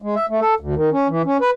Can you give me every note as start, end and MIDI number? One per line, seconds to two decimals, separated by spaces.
0.02 0.15 56
0.15 0.26 76
0.29 0.40 57
0.41 0.54 69
0.60 0.75 38
0.75 0.90 51
0.92 1.08 61
1.08 1.22 52
1.25 1.37 61
1.41 1.50 71